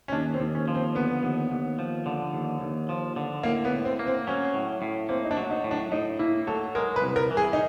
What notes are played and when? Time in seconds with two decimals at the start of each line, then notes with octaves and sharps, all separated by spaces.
0.08 C#4
0.12 D#2 D4
0.34 C4
0.40 D#2
0.55 C#4
0.68 F3
0.75 C4
0.95 D3 B3
1.23 D#2
1.51 D#2
1.79 F3
2.06 D3
2.33 D#2
2.61 D#2
2.89 F3
3.16 D3
3.43 A2 A#3
3.65 B3
3.71 A2
3.85 C4
3.99 A#3
4.07 C4
4.27 F#3 C#4
4.54 A2
4.82 A2
5.09 A#3 C4
5.25 D#4
5.31 D4
5.37 F#3
5.51 D#4
5.64 A2
5.71 D4
5.92 A2 D#4
6.19 A#3 E4
6.47 F#3 A4
6.75 G#3 A#4
6.96 B4
7.02 C2
7.16 A#4
7.30 E3
7.37 G#4
7.53 D#4